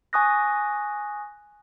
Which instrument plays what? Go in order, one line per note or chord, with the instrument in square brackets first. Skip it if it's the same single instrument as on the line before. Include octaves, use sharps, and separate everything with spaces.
[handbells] G#5 C#6 D#6 F#6 A#6